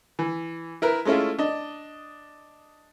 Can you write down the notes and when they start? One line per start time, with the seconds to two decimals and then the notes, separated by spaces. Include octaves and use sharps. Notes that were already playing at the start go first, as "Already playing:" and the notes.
0.19 E3
0.82 E4 A#4 B4
1.05 G#3 A3 C#4 E4 F4
1.39 D4 D#5